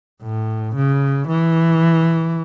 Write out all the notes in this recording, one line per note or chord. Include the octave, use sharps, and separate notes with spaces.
A2
C#3
E3